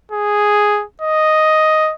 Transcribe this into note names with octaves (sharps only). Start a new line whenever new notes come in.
G#4
D#5